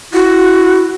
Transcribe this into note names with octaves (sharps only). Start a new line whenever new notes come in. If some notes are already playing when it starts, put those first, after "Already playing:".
E4 F#4